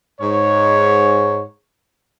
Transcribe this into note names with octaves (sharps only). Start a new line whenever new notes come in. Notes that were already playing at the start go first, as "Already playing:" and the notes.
G#2 C#5